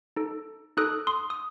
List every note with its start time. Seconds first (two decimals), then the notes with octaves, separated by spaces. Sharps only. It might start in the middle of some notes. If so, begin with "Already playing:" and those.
0.16 D#4 A4
0.77 D#4 A4 D#6 F#6
1.07 C6 D#6
1.30 D#6